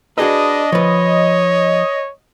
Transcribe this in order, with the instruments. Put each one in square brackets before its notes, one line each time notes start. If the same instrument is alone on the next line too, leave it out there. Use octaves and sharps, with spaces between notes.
[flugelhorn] D4 [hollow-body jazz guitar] F#4 G#4 B4 [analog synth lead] D#5
[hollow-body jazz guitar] F3 B4 [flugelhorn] C#5